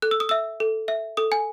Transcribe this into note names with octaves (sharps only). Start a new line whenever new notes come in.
A4 F#6
E6
D#6
E5 E6
A4
E5
A4 D#6
G#5